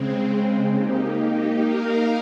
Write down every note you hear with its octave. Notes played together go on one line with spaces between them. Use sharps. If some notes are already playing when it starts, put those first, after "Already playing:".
Already playing: C#3 G#3 C4
A#3 D#4 G4
A#3 D#4 A#4 F5